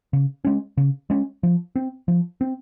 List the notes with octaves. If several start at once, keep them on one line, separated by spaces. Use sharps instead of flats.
C#3
G#3 C#4
C#3
G#3 C#4
F3
C4
F3
C4